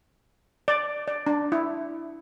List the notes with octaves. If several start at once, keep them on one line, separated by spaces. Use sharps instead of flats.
D5
D5
D4
E4